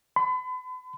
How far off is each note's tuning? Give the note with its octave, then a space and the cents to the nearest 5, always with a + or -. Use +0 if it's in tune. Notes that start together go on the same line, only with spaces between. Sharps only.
B5 +40